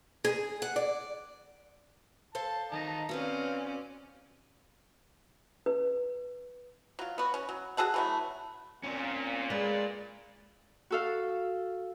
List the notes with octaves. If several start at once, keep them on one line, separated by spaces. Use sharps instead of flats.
G#4
F#5
D5
A4 C5 F5 A5
D#3 D#5 A5 A#5
C4 C#4 F#4 B4 C5 D5 F5
B4
F#3 F4
B3 F#4
C#4
F#3
F#4 G#4 A4 F#5
E3 F#3 A3
A#2 C4 C#4
G#3 B3 D5
F#4 A4 F5